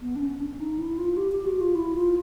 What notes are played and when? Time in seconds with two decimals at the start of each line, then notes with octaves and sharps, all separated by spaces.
0.01 B3
0.16 D4
0.21 C#4
0.40 D4
0.60 D#4
0.78 E4
0.98 F4
1.17 G4
1.32 G4
1.46 F#4
1.61 F4
1.75 E4
1.95 F4